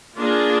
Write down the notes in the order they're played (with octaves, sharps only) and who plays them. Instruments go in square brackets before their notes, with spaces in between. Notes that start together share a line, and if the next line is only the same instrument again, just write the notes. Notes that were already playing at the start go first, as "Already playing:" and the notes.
[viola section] A#3 D4 F4 G#4